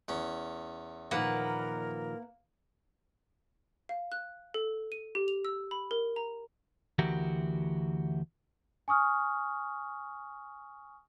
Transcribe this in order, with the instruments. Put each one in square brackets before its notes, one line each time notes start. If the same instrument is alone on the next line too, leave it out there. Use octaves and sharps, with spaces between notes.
[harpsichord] E2 C#4
[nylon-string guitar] A#2 D#3 F3 [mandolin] A#3 B4 F#5 [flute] A#4
[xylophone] F5
F#6
A4
D#7
G4
F7
E6
B5
A#4
A#5
[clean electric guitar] D2 E3 F#4 G4 A#4
[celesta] G#5 C#6 D#6 F6